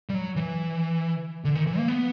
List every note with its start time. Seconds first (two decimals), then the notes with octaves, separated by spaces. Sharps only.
0.09 G3
0.14 F#3
0.36 E3
1.45 D3
1.56 D#3
1.67 E3
1.78 A#3
1.88 B3